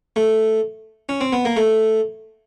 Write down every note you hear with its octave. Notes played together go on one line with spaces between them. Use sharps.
A3
C#4
C4
B3
A#3
A3